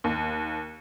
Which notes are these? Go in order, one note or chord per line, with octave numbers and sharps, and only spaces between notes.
D#2